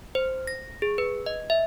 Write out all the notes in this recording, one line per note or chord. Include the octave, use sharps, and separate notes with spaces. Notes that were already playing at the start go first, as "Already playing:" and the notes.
C5
A#6
G#4
B4
D#5
E5